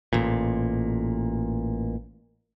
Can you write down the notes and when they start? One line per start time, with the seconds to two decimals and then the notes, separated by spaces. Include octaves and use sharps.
0.13 A1 A#2